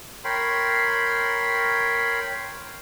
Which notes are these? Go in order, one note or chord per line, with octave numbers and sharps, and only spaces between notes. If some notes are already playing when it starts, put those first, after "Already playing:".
A#4 C#5 G5 B5 C6